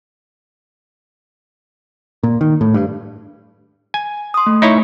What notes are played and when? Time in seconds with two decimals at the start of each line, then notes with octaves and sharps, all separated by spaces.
2.23 A#2
2.41 D#3
2.61 A2
2.74 G2
3.94 G#5
4.34 C6 D#6
4.46 A3
4.62 D#4 E4 C#5